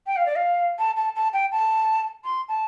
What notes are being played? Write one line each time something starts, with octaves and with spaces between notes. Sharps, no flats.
G5
F5
D5
F5
A5
A5
A5
G5
A5
C6
A5